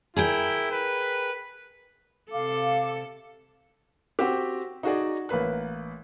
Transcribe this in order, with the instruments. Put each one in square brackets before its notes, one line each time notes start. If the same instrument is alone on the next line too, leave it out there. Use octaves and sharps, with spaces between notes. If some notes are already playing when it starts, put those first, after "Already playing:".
[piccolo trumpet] E4 [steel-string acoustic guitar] G#4 A#4 G5
[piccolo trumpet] B4
[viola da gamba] C3 A4 [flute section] F5 D6
[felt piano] C4 F#4 G4
D#4 F#4 G#4 D5
A1 A#3 B4 F#6